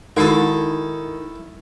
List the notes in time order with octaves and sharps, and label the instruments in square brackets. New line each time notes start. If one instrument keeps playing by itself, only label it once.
[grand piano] D#3 [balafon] G#3 D#4 F#4 [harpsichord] E4 A4